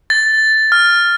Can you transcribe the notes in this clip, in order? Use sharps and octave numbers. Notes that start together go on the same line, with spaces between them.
A6
F6